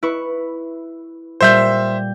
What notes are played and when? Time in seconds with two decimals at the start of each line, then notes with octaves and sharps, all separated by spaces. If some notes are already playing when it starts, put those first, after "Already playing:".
0.03 E4 B4 C#6
1.41 A#2 G3 C5 E5 G6